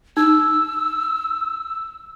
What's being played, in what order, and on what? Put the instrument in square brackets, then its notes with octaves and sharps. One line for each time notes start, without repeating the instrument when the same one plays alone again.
[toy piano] D#4 [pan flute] E6